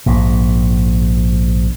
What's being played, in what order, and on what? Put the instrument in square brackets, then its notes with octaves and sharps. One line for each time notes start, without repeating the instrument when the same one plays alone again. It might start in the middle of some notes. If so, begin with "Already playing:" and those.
[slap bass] A#1 G#2